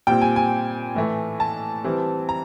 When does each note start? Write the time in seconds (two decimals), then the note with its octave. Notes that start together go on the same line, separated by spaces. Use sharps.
0.07 A#2 G3 C4 G5
0.22 G#5
0.36 G#5
0.95 A2 E3 A3
1.40 A5
1.84 E3 G3 C4
2.29 A#5